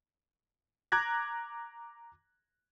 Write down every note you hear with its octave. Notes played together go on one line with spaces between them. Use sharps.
A#5 D6 F#6 G#6 A#6